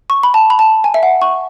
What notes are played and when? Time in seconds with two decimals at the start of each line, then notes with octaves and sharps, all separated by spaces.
0.10 C#6
0.23 B5
0.34 A5
0.50 B5
0.59 A5
0.84 G#5
0.94 E5
1.03 F#5
1.22 C#6